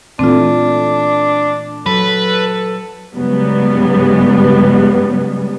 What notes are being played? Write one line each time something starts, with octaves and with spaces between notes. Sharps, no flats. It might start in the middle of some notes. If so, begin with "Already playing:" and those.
A#2 E3 A3 C4 D4 F4
F#3 A4 B4
G#2 C#3 F#3 G3 B3